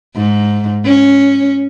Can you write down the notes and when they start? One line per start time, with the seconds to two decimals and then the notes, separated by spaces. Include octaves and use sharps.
0.16 G#2
0.85 C#4